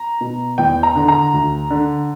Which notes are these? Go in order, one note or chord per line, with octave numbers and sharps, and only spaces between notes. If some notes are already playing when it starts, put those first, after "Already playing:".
Already playing: A#5
B2
E2 G5
A#5
D3
A#5
D2
D3